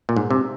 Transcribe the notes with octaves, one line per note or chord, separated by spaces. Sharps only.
A#2
G#2
C3